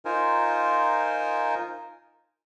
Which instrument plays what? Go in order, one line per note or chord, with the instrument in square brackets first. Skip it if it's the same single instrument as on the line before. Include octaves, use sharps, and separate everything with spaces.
[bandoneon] D#4 F4 A#4 C5 G#5